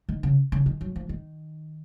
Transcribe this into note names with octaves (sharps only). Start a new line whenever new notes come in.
D#3
C#3
C#3
D#3
F#3
F3
D#3